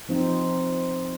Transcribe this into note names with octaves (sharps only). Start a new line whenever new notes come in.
F3 C4 D#4